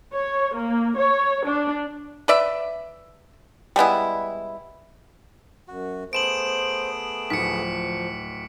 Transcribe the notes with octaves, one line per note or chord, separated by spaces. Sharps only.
C#5
A#3
C#5
D4
B4 D5 E5
G3 G#3 B3 E4
F#2 F#4
A3 B3 G#4 C5 D7 E7 F#7
D1 F3 B6 C#7